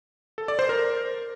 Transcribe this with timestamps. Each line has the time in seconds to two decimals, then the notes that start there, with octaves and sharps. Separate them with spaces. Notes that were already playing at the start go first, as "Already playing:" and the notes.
0.38 A4
0.48 D5
0.59 C5
0.69 A#4